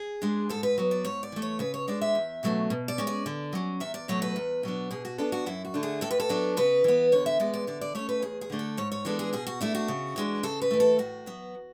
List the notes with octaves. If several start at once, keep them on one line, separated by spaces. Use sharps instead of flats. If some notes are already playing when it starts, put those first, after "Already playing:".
Already playing: G#4
G#3 D4
G#2 A4
B4
F#3 B3
D5
G#2 C#5
D5
E3 A3
C#5
C#3 B4
C#5
G#3 D4 D5
E5
E2
B2 F#3 A3 C#4
B2
D5
G#3 C#4
D5
D3
F#3 C#4
E2 E5
D5
B2 F#3 A3 C#5
B4
E2
B2 F#3 B3 D4
B2 G#4
F#4
F#3 B3 D4 A4
F#4
F#2 E4
F#4
D3 A3 D4
G#4
A2 A4
B4
A4
F#3 B3 D4
C#3 B4
E3 B3
D3 C#5
E5
G#3 B3 D5
D5
D3 D5
D5
A3 C#4 C#5
B4
E2 G#4
G#4
D3 A3 D4
A4
G#2 C#5
C#5
E3 G#3 B3 D4 A4
G#4
B2 G#4
F#4
A3 D4 E4
F#4
C#3
E3 G#3 D4
C#3 A4
B4
E3 A3
A4
A2 F#4
F#3 B3